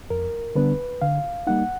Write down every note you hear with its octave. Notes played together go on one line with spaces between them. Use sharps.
F2 A#4
D3 G3 B3 D4 B4
D3 F5
G3 A#3 D#4 F#5